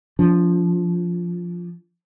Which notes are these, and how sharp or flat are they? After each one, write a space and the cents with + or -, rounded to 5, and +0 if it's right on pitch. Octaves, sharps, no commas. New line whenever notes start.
F3 +0 D4 -35